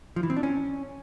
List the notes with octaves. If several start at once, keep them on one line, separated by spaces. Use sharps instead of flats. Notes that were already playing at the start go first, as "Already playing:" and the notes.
F3
E3
C4
D4
C#4